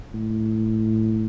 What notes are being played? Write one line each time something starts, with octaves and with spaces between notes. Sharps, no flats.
A2